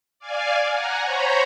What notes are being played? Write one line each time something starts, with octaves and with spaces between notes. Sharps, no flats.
D5 F5 G#5
F#5 G#5 A#5
C5 C#5 A#5 B5 C#6